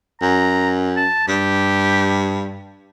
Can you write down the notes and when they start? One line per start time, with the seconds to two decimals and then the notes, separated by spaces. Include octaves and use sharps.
0.22 F#2 A#5
0.97 A5
1.28 G2 G4